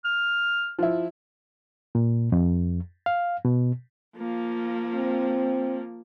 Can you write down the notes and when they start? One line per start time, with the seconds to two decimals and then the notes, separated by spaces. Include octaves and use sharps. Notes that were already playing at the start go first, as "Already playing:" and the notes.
0.05 F6
0.79 F3 E4
1.95 A#2
2.32 F2
3.06 F5
3.45 B2
4.16 F3 A#3
4.95 C4